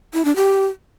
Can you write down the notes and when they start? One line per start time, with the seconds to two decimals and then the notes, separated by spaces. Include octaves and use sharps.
0.14 E4
0.25 D4
0.36 G4